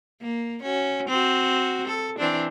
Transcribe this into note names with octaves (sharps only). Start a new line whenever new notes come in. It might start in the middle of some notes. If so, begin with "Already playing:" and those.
A#3
C#4 F#4
C4 F#4
A4
E3 C4 D4